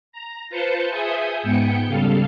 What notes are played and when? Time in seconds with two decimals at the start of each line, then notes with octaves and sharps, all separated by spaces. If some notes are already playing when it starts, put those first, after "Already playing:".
0.12 A#5
0.49 F4 B4 C5 A5 G6 C#7
0.89 G#4 E5 G#5 D#6 G6
1.43 G#2 B3 G5 G6 C#7
1.87 C#3 G3 A4 F5